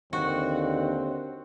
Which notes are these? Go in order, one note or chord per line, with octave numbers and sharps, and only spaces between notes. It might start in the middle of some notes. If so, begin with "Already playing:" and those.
D#2 D3 C4 F#4